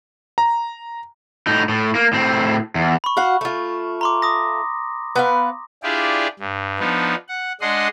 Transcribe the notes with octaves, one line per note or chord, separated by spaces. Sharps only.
A#5
A2 D#4
A2
A#3
A2 C4
E2
B5 C#6
F#4 F5 F#5
A3 F4
A#5 C6 D6
D6 D#6 A#6
B3 B4 F5
D4 E4 F4 G4 G#4 D5
G2
F3 B3 D4 D#4
F#5
G#3 D4 D#5 F#5 C6